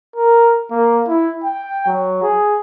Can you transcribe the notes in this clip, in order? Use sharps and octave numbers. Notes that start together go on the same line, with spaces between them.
A#4
A#3
E4
G5
F#3
G#4